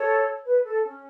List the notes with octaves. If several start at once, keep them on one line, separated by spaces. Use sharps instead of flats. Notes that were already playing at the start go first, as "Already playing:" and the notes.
Already playing: A4 C#5
B4
A4
C#4